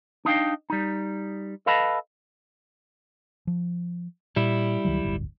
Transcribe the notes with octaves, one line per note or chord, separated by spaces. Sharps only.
D4 D#4 F5 G5
G3 D#4
A4 B4 D#5 F5 A5 B5
F3
A#2 G3 E4
C#2 D#3 F#3
D1 G1 D2